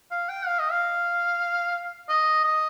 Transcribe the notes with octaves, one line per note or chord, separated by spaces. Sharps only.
F5
G5
F5
D#5
F5
D#5
D#5